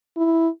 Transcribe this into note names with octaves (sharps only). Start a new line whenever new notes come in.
E4